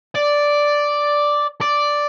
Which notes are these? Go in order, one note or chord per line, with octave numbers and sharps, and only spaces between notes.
D5
D5